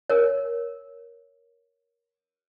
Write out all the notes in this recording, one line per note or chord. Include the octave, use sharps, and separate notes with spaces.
A#4 C#5